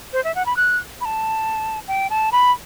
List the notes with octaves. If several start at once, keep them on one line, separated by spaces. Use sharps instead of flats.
C5
E5
F#5
B5
F#6
B5
A5
G5
A5
B5